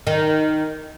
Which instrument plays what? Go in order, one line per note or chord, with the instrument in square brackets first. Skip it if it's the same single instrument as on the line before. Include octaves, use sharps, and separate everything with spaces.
[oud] D#3